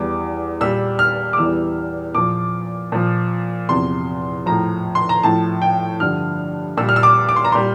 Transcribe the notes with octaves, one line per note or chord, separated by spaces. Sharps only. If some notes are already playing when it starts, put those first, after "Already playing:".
Already playing: E2 E3 G3 D6
A#2 G3 E6
F6
D6
E2 E3 G3 E6
A#2 F3 D6
A#2 F3
E2 C3 F3 C6
A2 F3 A#5
C6
A#5
A2 F3 A5
G5
G2 D3 F3 F6
A#2 G3 E6
F6
E6
D6
D6
C6
A#5
A#2 G3 C6